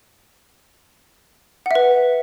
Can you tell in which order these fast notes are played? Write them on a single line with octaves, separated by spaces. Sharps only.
F#5 E5 B4